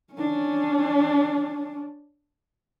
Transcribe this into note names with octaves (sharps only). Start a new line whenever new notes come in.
C#4 D4